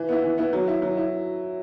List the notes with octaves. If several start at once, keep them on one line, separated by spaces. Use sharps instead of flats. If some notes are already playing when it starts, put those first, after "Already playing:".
Already playing: E3
B3 E4
E3
B3 E4
F#3
E4
F#3
E4